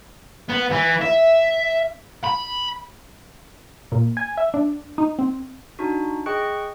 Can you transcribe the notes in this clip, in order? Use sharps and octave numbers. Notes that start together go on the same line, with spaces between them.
B3
E3
E5
B5
A#2
G#5
E5
D4
D#4
C4
D4 D#4 F#4
G#4 D#5 G5 C#6 F#6 C#7